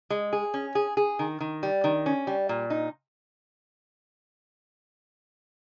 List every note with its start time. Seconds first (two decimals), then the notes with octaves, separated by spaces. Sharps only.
0.10 G#3
0.33 G#4
0.54 C#4
0.75 G#4
0.97 G#4
1.19 D#3
1.40 D#3
1.63 G3
1.84 D#3
2.06 C#4
2.27 G3
2.49 A#2
2.70 D#4